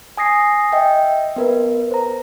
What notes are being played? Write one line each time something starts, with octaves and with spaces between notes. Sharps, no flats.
G#5 D#6 A#6 C7
D#5 E5 G5
B3 A#4 B4
C5 A#5